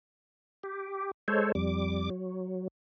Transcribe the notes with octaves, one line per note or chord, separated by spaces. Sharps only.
G4
G#3 A4 C5 C#5
F2 G3 D6
F#3